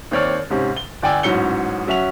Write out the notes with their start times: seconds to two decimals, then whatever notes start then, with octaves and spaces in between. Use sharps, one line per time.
0.11 D#2 C4 C#5 D5 F6
0.50 G#2 C3 C#4
0.77 G7
1.02 G1 D5 G5 G#5 E6
1.23 A1 G#2 F#3 C#4 C#7 G7
1.87 F#3 C#4 E5 F#5 F7